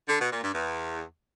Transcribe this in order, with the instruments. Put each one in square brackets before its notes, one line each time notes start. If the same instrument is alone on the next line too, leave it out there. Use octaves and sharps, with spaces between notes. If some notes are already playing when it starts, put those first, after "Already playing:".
[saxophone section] D3
B2
A#2
G2
E2